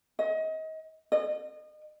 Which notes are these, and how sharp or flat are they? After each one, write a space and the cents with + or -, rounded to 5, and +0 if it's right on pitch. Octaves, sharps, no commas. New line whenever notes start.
D#5 +30
D#5 -35